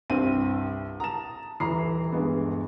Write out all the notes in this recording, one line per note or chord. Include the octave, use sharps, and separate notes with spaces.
C2 G2 C4 D#7
A5 A#5 D#6 E7
D#1 E3 A#5 B5 C7
G2 G#3 B3